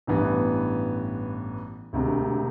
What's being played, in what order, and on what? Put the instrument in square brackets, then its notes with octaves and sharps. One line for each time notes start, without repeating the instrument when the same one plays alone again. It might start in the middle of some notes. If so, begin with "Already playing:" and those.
[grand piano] A1 G2 E3 B3
E1 D2 C3